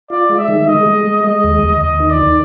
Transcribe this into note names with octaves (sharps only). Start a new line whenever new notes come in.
F4 D5
G#3
E5
D#3
G#3 D#5
G#3
G#3
G#3 D#5
D#2
D#2
D#2 D#5
D#3
D5
D#3